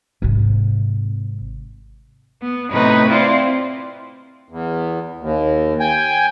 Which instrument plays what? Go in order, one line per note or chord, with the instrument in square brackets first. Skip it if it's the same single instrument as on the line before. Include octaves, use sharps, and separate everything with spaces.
[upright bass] G#1 C3
[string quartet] B3
A2 C3 D#4 B4 C#5 B5
C4 E4 F4 C5 D5 F5
[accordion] E2
D#2
G5 G#5